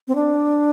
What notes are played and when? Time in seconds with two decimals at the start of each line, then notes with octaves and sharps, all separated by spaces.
0.08 C4
0.15 D4